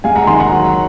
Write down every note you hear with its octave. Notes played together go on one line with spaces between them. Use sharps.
G#3 F5 G#5
F#5 A#5
D#3 G#5 C6
F#5 A#5
F#3